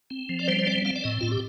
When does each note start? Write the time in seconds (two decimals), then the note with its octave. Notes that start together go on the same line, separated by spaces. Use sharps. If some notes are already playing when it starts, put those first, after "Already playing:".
0.10 C4
0.29 F3
0.39 D5
0.48 G3 C5
0.59 C5
0.67 C4 D5
0.85 C4 F5
0.96 D5
1.04 A2 D#5
1.21 A2 F4
1.32 G4